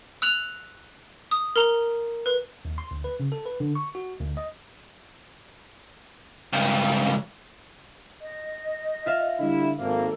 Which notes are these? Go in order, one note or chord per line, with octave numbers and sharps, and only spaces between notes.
E6 F#6 F7 F#7
D#6
A#4 A#5 G7
B4
D#2
C6
D2
B4
C#3
A4
B4
D3
C#6
F#4
D2
D#5
C#2 G2
D#5
F4 E5 F5
D3 G3 E4
G#1 A#3 A4